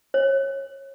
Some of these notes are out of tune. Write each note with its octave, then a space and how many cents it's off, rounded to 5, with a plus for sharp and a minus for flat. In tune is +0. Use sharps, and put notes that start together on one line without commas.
C#5 -30